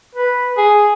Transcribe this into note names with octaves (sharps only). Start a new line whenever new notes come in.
B4
G#4